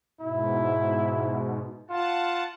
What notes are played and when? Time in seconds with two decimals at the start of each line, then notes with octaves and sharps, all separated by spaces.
0.21 G#2 B2 E4
1.90 F4 F#5 A5